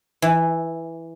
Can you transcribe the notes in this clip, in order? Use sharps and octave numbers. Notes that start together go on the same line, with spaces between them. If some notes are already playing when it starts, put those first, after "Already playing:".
E3